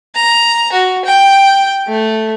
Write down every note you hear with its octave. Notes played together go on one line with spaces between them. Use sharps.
A#5
F#4
G5
A3